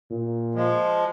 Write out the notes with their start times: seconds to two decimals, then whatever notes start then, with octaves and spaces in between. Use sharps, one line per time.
0.11 A#2
0.55 F3 G#3